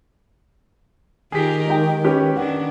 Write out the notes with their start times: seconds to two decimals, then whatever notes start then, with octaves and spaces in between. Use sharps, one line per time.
1.32 D#3 F4 G4 G#4 A#4 B6
1.68 G#3 D#4 G5
2.04 C#4 G4 B4
2.37 D#3 C#4 D4 F#5